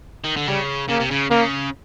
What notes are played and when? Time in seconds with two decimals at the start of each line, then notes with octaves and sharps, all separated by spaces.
0.24 D#3
0.37 D3
0.47 C#3 G3
0.89 C#3 A#3
1.00 C3
1.11 C#3
1.31 C#3 A#3